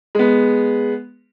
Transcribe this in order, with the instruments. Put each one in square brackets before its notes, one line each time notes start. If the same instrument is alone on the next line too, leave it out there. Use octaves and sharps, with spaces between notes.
[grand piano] G#3 B3